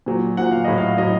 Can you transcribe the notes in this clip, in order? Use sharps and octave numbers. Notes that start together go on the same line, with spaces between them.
A#2 F#3
A#2 F#3 F#5
F5
A2 F#3 D#5
F5
A2 F#3 D#5